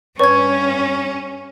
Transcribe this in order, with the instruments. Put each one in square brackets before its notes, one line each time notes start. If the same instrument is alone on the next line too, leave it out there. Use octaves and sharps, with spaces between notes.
[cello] G2 C#4 [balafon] B4 C#5 [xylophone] C#6 G#6